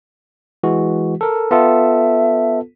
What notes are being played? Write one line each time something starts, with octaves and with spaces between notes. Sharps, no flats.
E3 G#3 F#4
A4 A#4
B3 F4 A4 E5